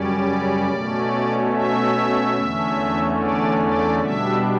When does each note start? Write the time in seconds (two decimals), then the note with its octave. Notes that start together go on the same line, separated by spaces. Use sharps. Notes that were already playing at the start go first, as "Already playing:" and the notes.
Already playing: F#2 C#3 G3 C#4 D5
0.68 B2 A3 C#4
1.51 E5
2.33 E2 D3 A3 C#4
3.16 D5
3.58 D5
3.99 B2 G3 D4 E5